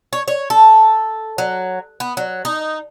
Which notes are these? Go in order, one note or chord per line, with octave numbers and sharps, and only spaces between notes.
C#5
C#5
A4
F#3
B3
F#3
D#4